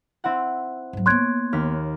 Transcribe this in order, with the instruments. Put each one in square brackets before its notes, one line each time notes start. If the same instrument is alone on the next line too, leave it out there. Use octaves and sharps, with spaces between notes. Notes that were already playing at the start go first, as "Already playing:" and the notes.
[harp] C4 E4 F#5
[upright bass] G#2 F#3
[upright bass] A#3 B3 [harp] C#5 D7 [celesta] C6 F#6 G#6
[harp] D#2 F6 B6